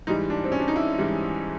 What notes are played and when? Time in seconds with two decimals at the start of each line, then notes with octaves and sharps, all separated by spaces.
0.07 G#2 E3 G3 D#4
0.30 D4
0.44 C4
0.52 C#4
0.60 D4
0.68 D#4
0.76 E4
0.98 G#2 E3 G3